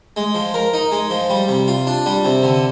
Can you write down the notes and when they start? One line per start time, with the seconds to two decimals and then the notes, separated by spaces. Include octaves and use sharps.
0.16 G#3
0.34 F3
0.54 A#4
0.73 D#4
0.91 G#3
1.10 F3
1.30 G3
1.49 C3
1.68 F4
1.87 D4
2.06 G3
2.25 C3
2.43 D3